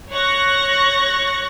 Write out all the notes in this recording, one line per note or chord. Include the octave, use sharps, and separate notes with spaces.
C#5 C#6 F#6 A#6